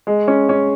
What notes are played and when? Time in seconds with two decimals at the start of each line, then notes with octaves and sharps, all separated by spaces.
0.07 G#3
0.28 C#4
0.49 C#4